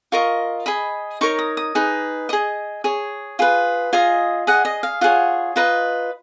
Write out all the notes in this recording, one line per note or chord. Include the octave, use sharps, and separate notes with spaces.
F4 A#4 D#5 C#6
G#4 D#5 B5
D#4 A#4 C#5 C#6
D#6
D#6
D#4 G#4 B4
G#4 D#5 D#6
G#4 C#5
F4 G#4 B4
F4 G#4 D#5 G#5
G#4 D#5 F#5
D#5
F5
F4 G#4 C#5 F#5
F4 B4 D#5 A#5